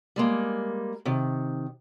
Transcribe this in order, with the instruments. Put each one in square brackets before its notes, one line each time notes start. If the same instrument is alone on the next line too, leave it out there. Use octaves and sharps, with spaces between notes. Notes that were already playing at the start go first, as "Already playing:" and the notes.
[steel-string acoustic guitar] G3 G#3 A#3
C3 D#3